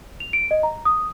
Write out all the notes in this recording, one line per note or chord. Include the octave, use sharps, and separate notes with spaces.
F7
D7
D#5
A#5
D#6